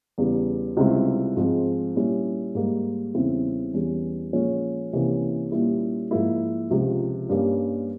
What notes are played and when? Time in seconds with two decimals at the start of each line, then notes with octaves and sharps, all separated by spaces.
0.18 E2 C#3 G3
0.77 C#2 C3 G3 C4 E4
1.37 G#2 F3 G#3 C4
1.96 A#2 G3 C#4 E4
2.55 G#2 G3 A#3
3.14 E2 C#3 G3 C4 E4
3.73 E2 E3 G3 C#4
4.33 A#2 F3 G#3 C#4
4.92 C2 C3 E3 A#3 C#4
5.52 A#2 G3 C#4 E4
6.11 G#2 F3 A#3 E4
6.70 C#2 C3 F3
7.29 G2 G3 A#3 C#4